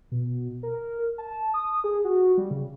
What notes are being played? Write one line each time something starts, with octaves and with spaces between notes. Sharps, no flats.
B2
A#4
A5
D#6
G#4
F#4
G3
C#3